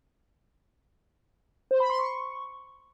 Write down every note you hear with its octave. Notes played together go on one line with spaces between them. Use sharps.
C5
B5
C6
C#6